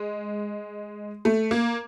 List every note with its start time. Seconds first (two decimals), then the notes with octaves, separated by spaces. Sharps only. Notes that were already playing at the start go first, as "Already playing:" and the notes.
Already playing: G#3
1.25 A3
1.51 A#3